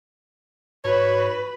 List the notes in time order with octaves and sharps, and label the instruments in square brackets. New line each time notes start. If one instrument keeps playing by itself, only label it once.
[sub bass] G#2 [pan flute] F#4 [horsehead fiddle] B4 B5 [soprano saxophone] C#5